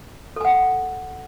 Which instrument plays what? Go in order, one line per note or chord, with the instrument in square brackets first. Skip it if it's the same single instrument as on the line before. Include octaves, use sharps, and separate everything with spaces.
[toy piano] A4
G#5
F#5